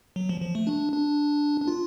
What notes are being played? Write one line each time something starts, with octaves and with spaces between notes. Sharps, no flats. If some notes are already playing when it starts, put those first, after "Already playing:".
F#3
F3
F3
A3
D4
D4
D4
F4